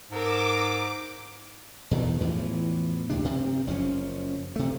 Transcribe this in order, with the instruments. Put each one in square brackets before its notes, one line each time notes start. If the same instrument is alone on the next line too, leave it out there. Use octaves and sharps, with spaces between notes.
[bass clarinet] G#2 [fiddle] A#4 E6 [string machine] D6
[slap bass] E2 B2 D#3 E3
E2 A2 E3 F3
C#2 A2 C3 D4
G2 C3
F#1 F#2 F3 C#4
C3 A3